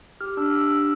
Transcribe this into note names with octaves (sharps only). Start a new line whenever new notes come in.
G4 F6
D4 E6
G4 E6
D4 E6